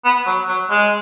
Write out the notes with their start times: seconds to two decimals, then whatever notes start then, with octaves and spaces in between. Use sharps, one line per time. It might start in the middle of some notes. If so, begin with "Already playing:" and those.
0.04 B3
0.26 F#3
0.48 F#3
0.70 G#3